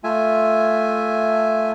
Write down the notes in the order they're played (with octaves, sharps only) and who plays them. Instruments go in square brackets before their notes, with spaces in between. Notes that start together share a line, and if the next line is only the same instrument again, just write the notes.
[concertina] A3 F4 E5 G#5